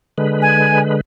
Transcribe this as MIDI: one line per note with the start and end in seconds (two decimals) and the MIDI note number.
0.18 1.01 50
0.18 1.01 56
0.18 1.01 71
0.42 0.79 80